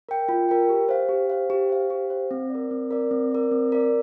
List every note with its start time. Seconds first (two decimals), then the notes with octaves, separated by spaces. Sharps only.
0.09 A#4 G5
0.29 F4
0.49 A#4 G5
0.69 G4
0.89 C5 F5
1.09 G4
1.30 C5 F5
1.50 G4
1.69 C5 F5
1.90 G4
2.10 C5 F5
2.31 C4
2.50 A#4 D5
2.71 C4
2.91 A#4 D5
3.11 C4
3.32 A#4 D5
3.51 C4
3.72 A#4 D5